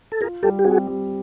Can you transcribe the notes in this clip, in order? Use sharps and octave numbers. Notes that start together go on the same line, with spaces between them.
A4
F4 G#4 A#4
G3 G4 A4
G4
C4 F#4 G#4
G3